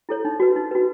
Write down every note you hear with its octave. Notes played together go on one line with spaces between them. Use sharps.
E4 A4 C#5
D#4
F#4 B4
D#4
F#4 B4